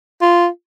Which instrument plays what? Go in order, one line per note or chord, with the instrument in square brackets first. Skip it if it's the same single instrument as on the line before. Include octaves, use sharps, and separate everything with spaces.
[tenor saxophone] F4